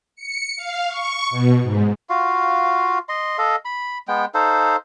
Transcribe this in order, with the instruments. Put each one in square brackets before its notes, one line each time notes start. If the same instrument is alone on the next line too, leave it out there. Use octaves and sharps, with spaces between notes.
[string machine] C#7
F5
C#6
B2
G#2
[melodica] F4 F#4 F5
D#5 C6
A4 D#5 F5
B5
G#3 B3 G5
D#4 A4 C5 F5